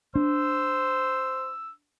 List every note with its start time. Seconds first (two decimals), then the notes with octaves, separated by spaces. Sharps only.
0.15 D4 C5 E6